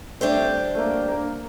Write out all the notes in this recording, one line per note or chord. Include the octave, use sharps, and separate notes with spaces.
G3 A3 C4 D4 G4 C5
A3
A#3
A#3